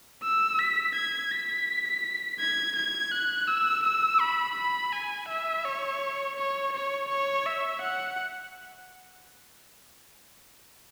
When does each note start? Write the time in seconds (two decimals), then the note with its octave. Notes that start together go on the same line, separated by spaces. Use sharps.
0.23 E6
0.59 B6
0.95 G#6
1.32 B6
2.40 G#6
2.76 G#6
3.12 F#6
3.47 E6
3.84 E6
4.21 B5
4.56 B5
4.93 G#5
5.29 E5
5.65 C#5
6.37 C#5
6.73 C#5
7.09 C#5
7.46 E5
7.82 F#5